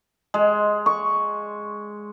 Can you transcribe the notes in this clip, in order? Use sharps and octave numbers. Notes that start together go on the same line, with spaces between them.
G#3
C#6